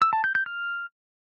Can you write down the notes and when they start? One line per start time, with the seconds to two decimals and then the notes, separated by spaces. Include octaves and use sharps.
0.02 E6
0.13 A5
0.24 G6
0.35 G6
0.46 F6